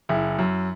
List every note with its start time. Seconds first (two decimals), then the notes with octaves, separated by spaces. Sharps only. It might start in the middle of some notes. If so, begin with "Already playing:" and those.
0.09 F#1 E4
0.39 F#2